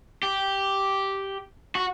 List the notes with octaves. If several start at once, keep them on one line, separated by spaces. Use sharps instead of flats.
G4
F#4